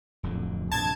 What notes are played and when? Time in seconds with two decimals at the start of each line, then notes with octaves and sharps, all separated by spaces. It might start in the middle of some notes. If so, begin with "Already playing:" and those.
0.23 D1 F2 D3
0.72 A#1 G2 C3 A5 G#6